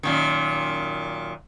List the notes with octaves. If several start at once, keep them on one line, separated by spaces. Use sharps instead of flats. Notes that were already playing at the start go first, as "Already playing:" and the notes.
F#2 A#2 D#3